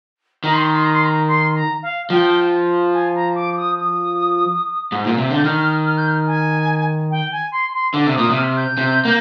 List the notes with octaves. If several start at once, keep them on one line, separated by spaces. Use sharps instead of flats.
D#3 A#5
C6
A#5
C6
A#5
C6
A#5
C6
A#5
F5
F3 G5
G#5
A#5
D6
D#6
D#6
G#2
A#2
C3
D3
G6
D#3 F6
F6
G6
F6
G#5
G5
G#5
C6
C6
D3 D6
C3
A#2 D#6
C3
F6
G6
C3
A#3